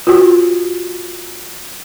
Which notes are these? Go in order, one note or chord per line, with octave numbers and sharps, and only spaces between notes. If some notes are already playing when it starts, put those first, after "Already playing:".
F4 F#4